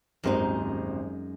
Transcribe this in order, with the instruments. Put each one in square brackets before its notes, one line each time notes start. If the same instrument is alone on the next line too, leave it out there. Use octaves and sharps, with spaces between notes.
[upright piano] D#1 G#1 C5 [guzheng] F#2 G#3 D#4